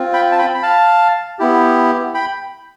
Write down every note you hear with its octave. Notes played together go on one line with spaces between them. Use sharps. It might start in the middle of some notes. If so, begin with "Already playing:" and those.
Already playing: C4 F4
G5 B5
A5
G5 B5
B5
F5 A5
B3 E4 G4
G5 B5